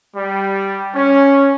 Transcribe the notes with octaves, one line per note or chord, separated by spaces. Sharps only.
G3
C#4